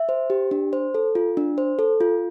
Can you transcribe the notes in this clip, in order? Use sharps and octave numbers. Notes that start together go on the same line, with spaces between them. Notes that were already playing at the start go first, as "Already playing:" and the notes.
Already playing: E5
C5
G4
D4
C5
A4
F4
D4
C5
A4
F4